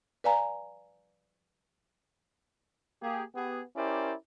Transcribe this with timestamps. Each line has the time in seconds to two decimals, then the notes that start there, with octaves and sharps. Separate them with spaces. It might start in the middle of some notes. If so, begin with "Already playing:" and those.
0.24 B4 D5 F5 G#5 A#5
3.02 A#3 G4 G#4
3.35 B3 G4 G#4
3.76 C#4 E4 G4 A#4 C5 D5